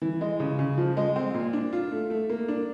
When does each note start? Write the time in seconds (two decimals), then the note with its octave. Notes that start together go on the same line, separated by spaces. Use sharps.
0.02 E3
0.21 G#3
0.40 C#3
0.59 C#3
0.78 F3
0.97 G#3
1.16 C4
1.34 A#2
1.53 D4
1.73 F4
1.92 A3
2.10 A3
2.30 A#3
2.48 D4